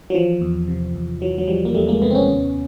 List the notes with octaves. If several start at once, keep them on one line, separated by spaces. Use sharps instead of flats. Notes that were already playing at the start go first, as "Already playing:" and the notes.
F#3
E3 F3
E2
C3
E2
E3 F#3
F#3
E3 F3 G3
A#3
E2 G3 A3
G#3 A#3
C3 A3 B3
C4
B3 C#4
D#2